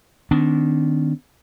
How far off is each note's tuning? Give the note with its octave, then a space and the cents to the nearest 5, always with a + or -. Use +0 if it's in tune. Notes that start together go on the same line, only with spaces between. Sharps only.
D#3 -15 B3 +40 D4 -30